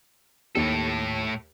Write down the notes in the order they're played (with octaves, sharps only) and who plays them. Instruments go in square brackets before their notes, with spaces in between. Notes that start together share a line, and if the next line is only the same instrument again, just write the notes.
[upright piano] D#2 G4 [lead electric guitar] A2 A4